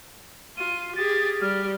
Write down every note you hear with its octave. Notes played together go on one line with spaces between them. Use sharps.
F4 D#7
G4 G#4 A6
G3 F6